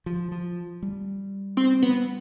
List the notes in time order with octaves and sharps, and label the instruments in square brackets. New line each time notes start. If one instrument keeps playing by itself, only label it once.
[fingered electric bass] F3
F3
G3
[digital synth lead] C4
B3